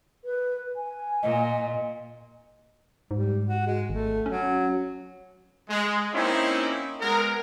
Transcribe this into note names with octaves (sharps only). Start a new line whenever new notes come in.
B4
G#5
A#2 D#5
G#2 G3
F#4
G#3
G#1 A3
F#3 C#4
G#3
A#3 C4 C#4 D#4 E4
G#3 B3 A#4